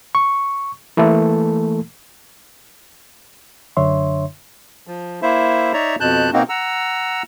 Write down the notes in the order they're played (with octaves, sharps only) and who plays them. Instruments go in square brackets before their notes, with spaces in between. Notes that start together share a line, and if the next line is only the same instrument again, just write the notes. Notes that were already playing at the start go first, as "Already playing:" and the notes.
[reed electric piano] C#6
E3 A3 A#3 A4
F#2 D3 D4 C#5 E5 C6
[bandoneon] F3
A#3 E4 C5 E5
D#4 C#5 D5 E5 A#5
F2 B2 A5 F#6 G6
B2 A#3 C4 D#4 F#4
F#5 A#5 E6